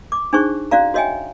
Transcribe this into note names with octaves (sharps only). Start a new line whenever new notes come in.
D6
D4 D#4 G#4 C5 C#6
C#4 F#4 D5 F5 A#5
F#4 C#5 D#5 E5 G5 G#5